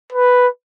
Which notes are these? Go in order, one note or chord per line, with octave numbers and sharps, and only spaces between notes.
B4